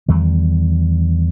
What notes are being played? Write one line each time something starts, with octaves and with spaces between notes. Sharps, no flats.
E2 D#3 G3